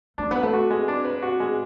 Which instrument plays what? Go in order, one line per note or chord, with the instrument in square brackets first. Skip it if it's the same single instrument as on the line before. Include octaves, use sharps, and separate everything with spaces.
[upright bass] A3 [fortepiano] D4
[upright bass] B3 [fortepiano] B4
[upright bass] A3
[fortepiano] F#4
G#3
D4
B4
F#4
G#3